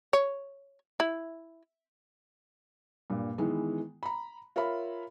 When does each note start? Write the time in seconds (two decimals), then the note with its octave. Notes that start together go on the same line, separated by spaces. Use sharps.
0.13 C#5
1.00 E4
3.10 G2 A#2
3.38 D#3 E3 G#3 B3
4.03 A#5 B5
4.56 F4 A#4 C#5 E5 F5 B5